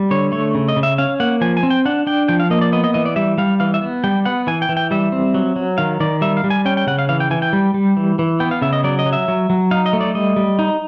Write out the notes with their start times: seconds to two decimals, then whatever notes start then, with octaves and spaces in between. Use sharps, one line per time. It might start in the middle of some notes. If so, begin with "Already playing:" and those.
Already playing: G3
0.11 D3 C#5
0.32 A3 C#5
0.55 C#3
0.68 D#5
0.76 C#3
0.83 E5
0.98 C#4 F5
1.20 A#3 F#5
1.41 F3 G#5
1.57 G#5
1.63 C4
1.70 G5
1.85 D4 F#5
2.07 D4 G5
2.28 F3 G5
2.40 F5
2.50 A#3 D#5
2.61 D5
2.72 B3 D#5
2.84 D#5
2.94 E3 D#5
3.05 D5
3.16 G3 E5
3.38 G3 F5
3.60 E3 F5
3.74 E5
3.81 B3
4.04 G3 G5
4.25 B3 F#5
4.47 E3 G#5
4.62 G5
4.69 E3
4.77 G5
4.91 G3 E5
5.12 C4
5.34 F#3
5.56 F#3
5.78 D#3 F5
6.00 D#3 D5
6.21 G3 E5
6.37 F5
6.44 G3
6.50 G#5
6.65 C#4 G5
6.77 G5
6.87 C#3 F#5
6.99 F5
7.09 E3 F5
7.20 G5
7.31 E3 G#5
7.42 G5
7.53 G3
7.74 G3
7.97 E3
8.19 E3
8.40 B3 G5
8.51 F5
8.62 C#3 E5
8.73 D#5
8.84 F#3 D5
8.99 D#5
9.06 F#3
9.13 E5
9.28 F#3
9.50 F#3
9.71 D#4 F5
9.86 D#5
9.93 A3
10.01 D5
10.15 G3 D#5
10.36 G3
10.59 D#4